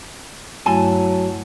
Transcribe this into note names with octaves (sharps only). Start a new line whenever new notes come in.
G2 F#3 A3 E4 G#5 A5